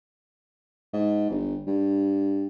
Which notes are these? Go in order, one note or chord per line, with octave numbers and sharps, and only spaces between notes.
G#2
G1
G2